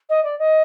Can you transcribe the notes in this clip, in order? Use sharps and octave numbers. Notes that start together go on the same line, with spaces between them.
D#5
D5
D#5